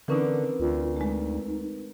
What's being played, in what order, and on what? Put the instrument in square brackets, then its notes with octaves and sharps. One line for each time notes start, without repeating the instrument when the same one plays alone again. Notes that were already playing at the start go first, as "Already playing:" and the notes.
[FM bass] D3 [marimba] E3 C#4 D#4 [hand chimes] C4 A#4 B4
[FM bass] D2 [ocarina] F4
[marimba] G#3 A3 [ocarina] D#4